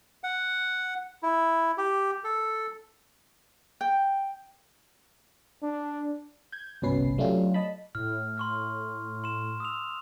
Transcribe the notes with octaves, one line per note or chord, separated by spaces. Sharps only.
F#5
E4
G4
A4
G5
D4
G6 G#6
G1 C2 B2 C#4 B4 C7
F#3 A3 C#4 D4 F4 G4
D#5 A5 B5
A2 F6
C6 C#6 F6
C6 E7
D#6 E6 F7